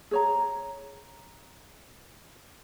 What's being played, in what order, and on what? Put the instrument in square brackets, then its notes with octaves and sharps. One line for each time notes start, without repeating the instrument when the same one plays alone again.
[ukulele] G#4 C#5 A#5